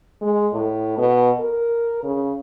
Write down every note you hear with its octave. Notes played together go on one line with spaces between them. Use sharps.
G#3
A2
B2
A#4
C#3